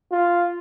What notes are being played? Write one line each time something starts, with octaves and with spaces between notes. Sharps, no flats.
F4